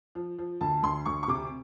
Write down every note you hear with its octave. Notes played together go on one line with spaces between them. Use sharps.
F3
F3
D2 A5
D2 C6
D2 C#6
C#6
C3 D6